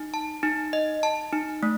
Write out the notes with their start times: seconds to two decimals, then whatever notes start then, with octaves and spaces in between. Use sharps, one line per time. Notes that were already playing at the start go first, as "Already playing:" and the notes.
Already playing: D#4
0.14 A5
0.43 D#4
0.73 D#5
1.03 A5
1.33 D#4
1.63 A3